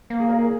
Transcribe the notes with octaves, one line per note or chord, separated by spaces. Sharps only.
A#3
G#4
A#4
G#4